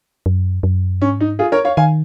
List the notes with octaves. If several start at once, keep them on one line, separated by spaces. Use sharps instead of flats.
F#2
F#2
G#2 C#4
D#4
F4 G#4
A#4 C#5
C#5 F5
D#3 F5 G#5